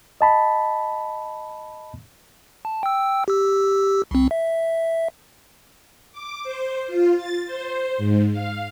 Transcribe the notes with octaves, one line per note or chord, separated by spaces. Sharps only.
D#5 A5 B5
A5
G5 E6
G4 E6
C2 C4
E5
D6
C5
F4
A6
C5
G#2
F5